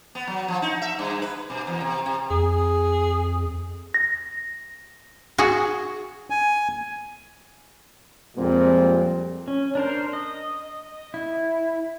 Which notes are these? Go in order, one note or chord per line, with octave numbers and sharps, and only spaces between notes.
B3
F#3
F3
D#4
E5
G2
B4
B2
E2
C3
C3
F2 G#4
A#6
F#4 G#4
G#5
F2 A#2 F3 G3 G#3 C4
C#4
D4 A#4 C5
D#5
E4